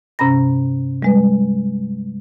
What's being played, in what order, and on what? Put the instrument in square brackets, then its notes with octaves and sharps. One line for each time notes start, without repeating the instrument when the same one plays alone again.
[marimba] G2 C3 C#4 A#5 B5 A#6
G3 G#3 B4